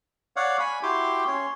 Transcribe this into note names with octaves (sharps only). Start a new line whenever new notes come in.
C#5 D5 F5 F#5
G#5 B5
E4 F#4 G4 G5 C6 D6
C#4 C#5 C6